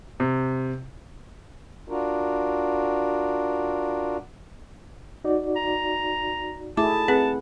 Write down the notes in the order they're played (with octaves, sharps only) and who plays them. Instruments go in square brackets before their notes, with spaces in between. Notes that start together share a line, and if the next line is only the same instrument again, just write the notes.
[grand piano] C3
[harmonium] D4 F4 F#4 A#4
[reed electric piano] D#4 F#4 D5
[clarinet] A#5
[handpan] A3 E4 G#4 [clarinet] A5 [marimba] D6
[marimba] C4 G#4 B4 [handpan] F#5